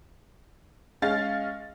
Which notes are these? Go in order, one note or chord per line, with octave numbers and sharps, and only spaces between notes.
G#3 C#4 F5 A6